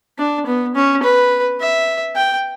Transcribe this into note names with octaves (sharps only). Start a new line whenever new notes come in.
D4
B3
C#4
B4
E5
G5